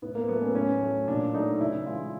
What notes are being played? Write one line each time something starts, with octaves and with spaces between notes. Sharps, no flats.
A2 B3
A#3
F#3 A3 B3
C#4
A2 C#4
F#3 A3
A#2 D4
F#3 A3 D#4
C#3 E4
E3 G#3 F4